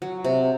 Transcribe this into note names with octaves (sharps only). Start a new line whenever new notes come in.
F#3
C3